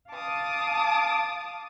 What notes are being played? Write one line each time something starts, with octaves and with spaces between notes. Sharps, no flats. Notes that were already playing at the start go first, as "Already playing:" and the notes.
F5 A5 D6 D#6